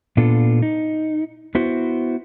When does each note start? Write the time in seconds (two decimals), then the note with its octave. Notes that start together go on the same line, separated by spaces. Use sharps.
0.17 A#2 B3 D4 F4 A4
0.62 D#4
1.55 B3 E4 F#4 C5